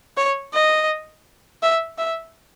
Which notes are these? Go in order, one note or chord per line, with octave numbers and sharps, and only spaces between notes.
C#5
D#5
E5
E5